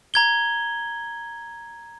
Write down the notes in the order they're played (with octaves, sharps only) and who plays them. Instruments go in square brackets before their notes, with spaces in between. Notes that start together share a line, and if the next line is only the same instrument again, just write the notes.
[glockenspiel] A#5 G#6 G7